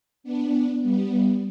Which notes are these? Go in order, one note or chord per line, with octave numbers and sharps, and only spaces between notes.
B3 D4
G3 B3